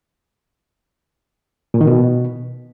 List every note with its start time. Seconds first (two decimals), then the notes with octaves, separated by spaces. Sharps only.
1.74 A#2
1.81 D#3
1.87 B2